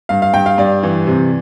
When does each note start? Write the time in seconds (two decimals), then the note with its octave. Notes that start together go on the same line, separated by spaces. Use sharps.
0.09 G2 F5
0.22 F5
0.33 G2 G5
0.46 F5
0.58 G2 D5
0.83 E3
1.07 C3